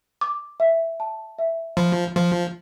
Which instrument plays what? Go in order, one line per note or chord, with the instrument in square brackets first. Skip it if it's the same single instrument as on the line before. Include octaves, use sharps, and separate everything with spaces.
[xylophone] D6
E5
A5
E5
[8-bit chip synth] F3 [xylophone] B5
[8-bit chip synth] F3 [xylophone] F5